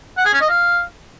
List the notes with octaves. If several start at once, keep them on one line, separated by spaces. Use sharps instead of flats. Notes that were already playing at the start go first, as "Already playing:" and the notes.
F#5
G#4
C#4
D#5
F5